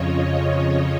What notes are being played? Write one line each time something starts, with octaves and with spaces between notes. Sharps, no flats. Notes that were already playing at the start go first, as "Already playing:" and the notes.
Already playing: F2 C#3 F3 C#5 D#5
C#5